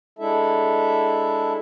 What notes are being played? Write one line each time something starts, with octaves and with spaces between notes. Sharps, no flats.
G#3 D4 E4 A4 E5